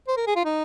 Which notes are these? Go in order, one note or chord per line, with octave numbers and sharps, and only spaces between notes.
C5
A#4
G#4
F4
D#4